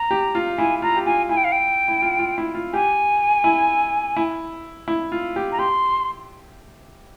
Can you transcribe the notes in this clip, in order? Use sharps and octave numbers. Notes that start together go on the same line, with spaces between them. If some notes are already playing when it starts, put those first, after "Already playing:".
Already playing: A#5
G4
F4
E4 G#5
F4 A#5
G4
F4 G#5
E4 G#5
G5
F5
G5
E4
F4
F4
E4
F4
G4 G#5
E4
E4
E4
F4
G4
A#5
G4 C6